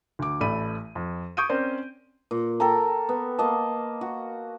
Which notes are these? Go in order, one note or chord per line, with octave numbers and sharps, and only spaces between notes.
D2 D6
A1 A3 D5 B5 D#7
F2
C#6 D#6 G6 G#6 D7 D#7
C4 C#4 A#4 C5 D5
A#2
A4 A#4 G5 A#5
B3
A#3 D#5 A5
F#4